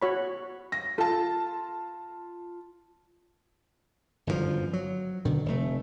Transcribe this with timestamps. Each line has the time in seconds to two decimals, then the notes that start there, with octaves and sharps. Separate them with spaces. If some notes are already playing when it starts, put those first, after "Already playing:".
0.02 F#4 C#5 B5
0.72 A#6
0.98 F4 A4 A5
4.27 G1 F#2 B2 F3
4.73 F#3
5.25 B2 D3 D#3
5.46 F1 A3